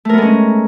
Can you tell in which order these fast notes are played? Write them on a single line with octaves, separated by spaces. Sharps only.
A3 A#4 B3 G#3 C#4